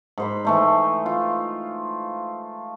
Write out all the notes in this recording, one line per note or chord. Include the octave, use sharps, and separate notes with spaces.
G#2 C5 B5
E3 A3 D#4
F4